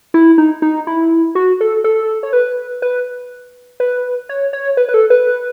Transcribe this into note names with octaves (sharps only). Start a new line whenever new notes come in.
E4
D#4
D#4
E4
F#4
A4
A4
C#5
B4
B4
B4
C#5
C#5
B4
B4
A4
B4